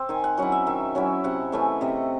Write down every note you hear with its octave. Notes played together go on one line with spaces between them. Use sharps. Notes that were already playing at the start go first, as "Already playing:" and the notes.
Already playing: C4 C6
D#3 G#5
F#5
F#3 C#4 E4 F#5
E5
D#3 E5
F#3 C#4 E4
C3 F#5
E3 A3 C#4 E5
C3 D#5